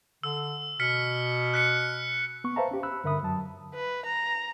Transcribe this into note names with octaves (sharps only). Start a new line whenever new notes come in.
D3 E6
B2 F6 B6 C#7
F#6 B6 C#7
B3 C#6
B4 C5 E5 F5 A5 A#5
C#4 G4
B5 E6 F#6
G2 D3 A#4 E5 B5 D#6
F#2 F#3 A5
B4
A#5